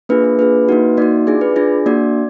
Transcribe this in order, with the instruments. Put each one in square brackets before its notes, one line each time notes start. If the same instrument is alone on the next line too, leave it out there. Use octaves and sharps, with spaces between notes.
[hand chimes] A#3 D4 F4 G#4 B4
B4
A#3 D4 F4 G#4 B4
A#3 D#4 F#4
A#3 D#4 F#4 D5
D4 F4 G#4 D5
B4
D4 F4 G#4 D5
A#3 D4 F#4 D5